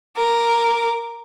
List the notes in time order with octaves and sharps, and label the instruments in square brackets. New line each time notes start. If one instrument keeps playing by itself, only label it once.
[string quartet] A#4 D6